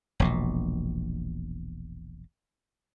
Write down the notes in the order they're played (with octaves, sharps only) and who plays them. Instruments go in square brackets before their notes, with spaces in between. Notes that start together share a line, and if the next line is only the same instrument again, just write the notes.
[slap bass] E1 A#1 B2